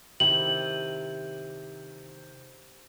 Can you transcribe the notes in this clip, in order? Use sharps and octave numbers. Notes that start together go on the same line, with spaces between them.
C3 D#3 E4 F#7